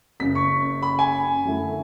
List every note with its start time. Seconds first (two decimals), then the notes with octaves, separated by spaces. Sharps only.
0.20 F#1 F#2 C#3 B6
0.35 C#6
0.82 B5
0.99 G#5
1.45 F#2 D3 A3 E4